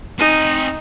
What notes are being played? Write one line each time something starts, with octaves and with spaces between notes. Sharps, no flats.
C4 D#4 G#5